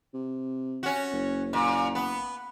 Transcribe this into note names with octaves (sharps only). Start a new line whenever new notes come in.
C3
C#4 F#4
F#1
A#2
B3